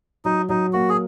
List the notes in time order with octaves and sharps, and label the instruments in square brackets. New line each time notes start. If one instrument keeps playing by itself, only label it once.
[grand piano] F#3 [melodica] D#4
[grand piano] F#3 [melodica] D#4
[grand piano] A#3 [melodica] F#4
[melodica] G#4